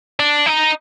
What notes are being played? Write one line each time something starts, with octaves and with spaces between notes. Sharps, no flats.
D4
D#4